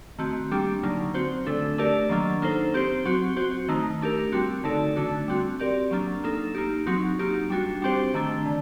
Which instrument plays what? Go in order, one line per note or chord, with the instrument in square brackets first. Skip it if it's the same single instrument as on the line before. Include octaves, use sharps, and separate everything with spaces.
[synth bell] D#3 A3 C4 F#4
G3 A#3 D4 G4
D3 F#3 A#3 D#4
C4 F#4 C5
D3 A3 D4 A4
A3 D4 G4 A#4 D5
D#3 F#3 A#3 D4
A#3 D#4 A4 C5
C4 G4 C5
F#3 C4 F#4
C4 F#4 C5
D#3 A3 D#4
A3 D4 G4 A#4
G3 C4 F#4
D3 A3 D#4 A4 D5
D3 A3 D4 F#4
G3 C4 F#4
C4 G4 A#4 D5
F#3 A#3 D4
A#3 D#4 A4
A#3 D#4 G4
F#3 C4 D#4 F#4
A#3 D#4 G4
G3 D4 F#4
G3 C4 G4 C5
D#3 A3 D4
D3